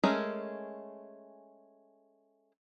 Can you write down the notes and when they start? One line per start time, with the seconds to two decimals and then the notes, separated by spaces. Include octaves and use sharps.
0.04 G#3 A3 C#4 G#4 A#4